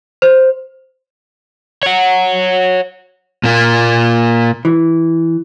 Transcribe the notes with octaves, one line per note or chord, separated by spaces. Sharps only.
C5
C#5 F#5
A#2 A#3
E3